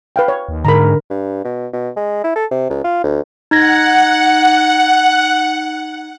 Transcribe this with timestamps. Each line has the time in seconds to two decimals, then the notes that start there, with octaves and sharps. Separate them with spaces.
0.16 B4 F5 G5
0.28 C#5
0.49 D#2
0.65 G#2 D3 A#4 A#5 B5
1.10 G2
1.45 B2
1.73 B2
1.96 G#3
2.24 E4
2.36 A4
2.51 C3
2.70 C#2
2.84 F4
3.04 D2
3.51 D#4 F#5 G#6 A#6